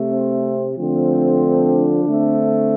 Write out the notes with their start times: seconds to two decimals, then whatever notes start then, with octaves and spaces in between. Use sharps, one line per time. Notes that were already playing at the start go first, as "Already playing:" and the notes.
Already playing: C3 A3
0.10 C4
0.75 D3 F3 A3 C4
1.39 D4
2.04 D3 A3 C4